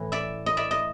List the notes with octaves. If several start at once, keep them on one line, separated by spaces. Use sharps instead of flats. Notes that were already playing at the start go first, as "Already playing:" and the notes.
Already playing: A2 E3
D5 E5
D#5
D5 E5
D#5